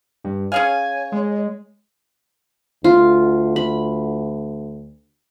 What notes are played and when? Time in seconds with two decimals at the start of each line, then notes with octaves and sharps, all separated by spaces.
0.24 G2
0.52 C#4 G#4 C#5 F5 G#5
1.12 G#3
2.84 D2 F4
3.56 B5